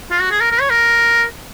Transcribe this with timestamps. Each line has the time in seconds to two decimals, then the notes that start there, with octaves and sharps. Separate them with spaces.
0.11 F4
0.21 F#4
0.31 G#4
0.41 A#4
0.51 A#4
0.61 C#5
0.70 A#4